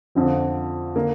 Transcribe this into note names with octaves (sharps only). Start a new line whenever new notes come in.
F2 D3 F3 C4
D3 A#3